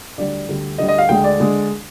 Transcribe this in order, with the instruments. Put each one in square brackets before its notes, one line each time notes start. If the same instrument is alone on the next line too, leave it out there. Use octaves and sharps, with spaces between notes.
[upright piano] D2 D3 G3 D5
D2 D3 G3
D2 D3 G3 D#5
D#5
F5
D2 D3 G#3 G5
D5
D3 G#3